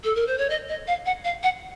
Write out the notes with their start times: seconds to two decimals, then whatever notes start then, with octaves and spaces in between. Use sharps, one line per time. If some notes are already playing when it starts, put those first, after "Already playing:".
0.04 A4
0.15 A#4
0.27 C5
0.38 C#5
0.50 D#5
0.69 D#5
0.87 F5
1.06 F#5
1.25 F5
1.43 F#5